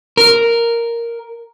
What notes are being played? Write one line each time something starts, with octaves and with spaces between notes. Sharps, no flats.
A#4